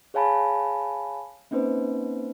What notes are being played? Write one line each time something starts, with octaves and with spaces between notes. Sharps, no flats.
G#4 C#5 F5 G#5 A5 B5
A#3 C4 C#4 D#4 B4 C5